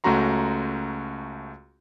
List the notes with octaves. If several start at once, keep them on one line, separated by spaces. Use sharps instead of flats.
C#2 A3 C#4 F#4 A#5 C6